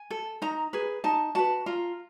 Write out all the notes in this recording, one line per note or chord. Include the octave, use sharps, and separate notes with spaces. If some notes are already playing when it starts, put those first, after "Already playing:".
Already playing: G#5
A4
D#4 A#5
G#4 B4
D#4 A5
F#4 B4 A5
F4 A#5